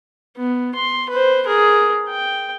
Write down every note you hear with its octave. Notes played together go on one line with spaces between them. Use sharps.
B3
C6
B4 C5
G#4 A#4
G5